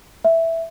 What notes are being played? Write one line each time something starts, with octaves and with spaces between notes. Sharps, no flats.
E5